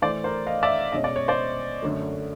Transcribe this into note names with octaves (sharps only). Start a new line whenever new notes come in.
A2 E3 A3 C5 D5
A#4 C5
D#5 F5
D5 E5
B2 G#3 C#4 D#5
D5
C#5
C5 D5
F#2 D3 F#3 A3